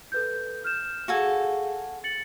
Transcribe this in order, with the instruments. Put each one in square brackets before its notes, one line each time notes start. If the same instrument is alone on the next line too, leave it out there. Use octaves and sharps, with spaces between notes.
[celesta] A4 B4 G6
F6 G6 E7
[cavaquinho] F#4 A4 G#5 [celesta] G#4 F5
[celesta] A6 C#7 F#7